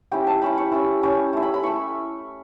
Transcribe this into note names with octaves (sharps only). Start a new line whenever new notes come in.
G3 C#4 E4 G5
A5
G3 C#4 E4 B5
C#6
G3 C#4 E4
G3 C#4 E4
A3 E4
B5
B5
A3 E4 C#6